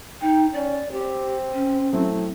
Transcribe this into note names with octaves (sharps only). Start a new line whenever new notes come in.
D#4 G5
C#4 D5
C4 G4
C#4
F#3 A3 C4 E4